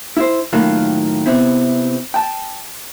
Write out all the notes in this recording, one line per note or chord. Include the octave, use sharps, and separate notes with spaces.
E4 C5
A2 D#3 F#3 A#3 F4
C3 B3 C4 E4
G5 A5